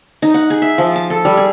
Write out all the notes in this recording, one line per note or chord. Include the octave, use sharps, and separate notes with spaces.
D#4
F#5
G#4
E5
F3
A5
A4
G3
G#4